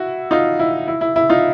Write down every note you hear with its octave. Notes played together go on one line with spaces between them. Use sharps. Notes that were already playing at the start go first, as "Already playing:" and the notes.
Already playing: E4 F#4
D#4 F4
E4
E4
E4
E4
D#4 F4